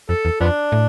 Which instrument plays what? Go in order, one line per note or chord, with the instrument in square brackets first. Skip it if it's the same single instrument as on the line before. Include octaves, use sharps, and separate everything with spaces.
[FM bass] F2 [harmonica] A4
[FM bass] E2
[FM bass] F2 [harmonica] F3 B3 D4
[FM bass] A2